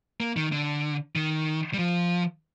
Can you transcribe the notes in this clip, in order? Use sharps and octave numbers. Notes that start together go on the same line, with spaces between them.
A#3
D#3
D3
D#3
G3
F3